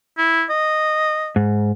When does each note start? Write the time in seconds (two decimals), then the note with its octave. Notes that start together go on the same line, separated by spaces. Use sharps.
0.18 E4
0.50 D#5
1.36 G#2